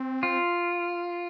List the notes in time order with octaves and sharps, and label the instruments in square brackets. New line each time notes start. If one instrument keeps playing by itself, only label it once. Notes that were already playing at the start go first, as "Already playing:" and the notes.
Already playing: [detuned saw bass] C4
[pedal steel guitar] F4